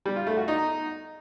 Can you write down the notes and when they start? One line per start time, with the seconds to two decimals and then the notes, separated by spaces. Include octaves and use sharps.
0.06 G3
0.16 F4
0.27 A3
0.37 F#4
0.48 D#4